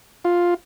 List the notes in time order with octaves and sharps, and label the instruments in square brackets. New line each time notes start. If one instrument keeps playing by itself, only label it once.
[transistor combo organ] F4